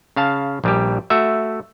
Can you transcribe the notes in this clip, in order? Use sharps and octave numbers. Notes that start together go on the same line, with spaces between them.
C#3 F5 A5
A#1 G3 G4
A3 F#4 E5